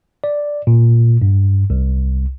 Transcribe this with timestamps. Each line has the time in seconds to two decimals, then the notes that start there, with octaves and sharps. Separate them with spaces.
0.24 D5
0.67 A#2
1.22 G2
1.70 C2